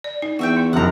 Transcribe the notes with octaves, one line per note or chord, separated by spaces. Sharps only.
D5
D#4
E2 F#4 E5 G5
E4
F1 F#2 F#5 A#5